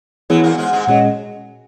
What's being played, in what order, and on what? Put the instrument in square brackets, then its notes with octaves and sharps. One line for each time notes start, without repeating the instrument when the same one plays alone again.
[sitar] F#2 F#3 [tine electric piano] E3 B3 E4 G#4
[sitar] A#2 A#3
G#2 G#3
G#2 G#3
[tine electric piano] A#2 G#3 C#4 G#4 D#5 [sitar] F#3